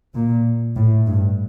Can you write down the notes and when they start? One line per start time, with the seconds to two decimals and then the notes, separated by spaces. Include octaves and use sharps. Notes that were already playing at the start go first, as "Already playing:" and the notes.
0.15 A#2
0.76 A2
1.07 G2